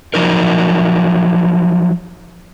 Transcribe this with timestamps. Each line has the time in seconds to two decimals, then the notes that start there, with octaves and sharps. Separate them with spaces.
0.14 F3 F#3 D#4 A#4